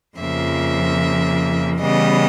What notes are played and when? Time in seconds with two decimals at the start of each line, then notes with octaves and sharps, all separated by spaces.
0.18 F2 C#3 F3 A#3 E5
1.80 C#3 E3 G3 B3 D#5